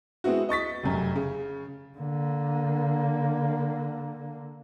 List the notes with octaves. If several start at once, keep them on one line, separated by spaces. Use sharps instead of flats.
G#3 B3 C4 E4 F#4
D#5 C#6 A6 B6
F1 F#2
C#3
D3 A#3